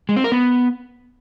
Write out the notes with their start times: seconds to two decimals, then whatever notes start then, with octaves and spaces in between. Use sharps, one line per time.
0.09 G#3
0.16 C4
0.24 A#4
0.32 B3